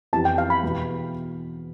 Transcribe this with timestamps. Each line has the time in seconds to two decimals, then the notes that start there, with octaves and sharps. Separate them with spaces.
0.13 F2 E3 B3 E4 G4 A5
0.25 G5
0.38 F5
0.50 B5
0.63 E2 B2 B3 E4